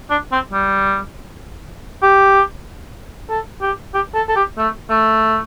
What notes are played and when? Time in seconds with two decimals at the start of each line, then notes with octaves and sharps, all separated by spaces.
0.10 D4
0.32 C4
0.53 G3
2.02 G4
3.30 A4
3.61 G4
3.94 G4
4.15 A4
4.29 A4
4.36 G4
4.58 A3
4.90 A3